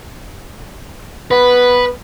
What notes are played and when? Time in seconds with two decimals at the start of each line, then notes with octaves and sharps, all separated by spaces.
1.31 B3 B4